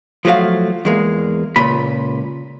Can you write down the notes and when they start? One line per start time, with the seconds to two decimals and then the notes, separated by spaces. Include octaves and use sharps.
0.25 F3 F#3 A3 F#4 F5
0.85 E2 G#3 A#3
1.56 C#2 A#2 B5